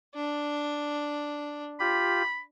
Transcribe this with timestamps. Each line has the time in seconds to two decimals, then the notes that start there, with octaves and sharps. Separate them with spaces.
0.15 D4
1.80 F4 G4 B5